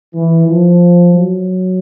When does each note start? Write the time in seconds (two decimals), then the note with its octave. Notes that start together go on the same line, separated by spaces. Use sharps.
0.15 E3
0.47 F3
1.13 F#3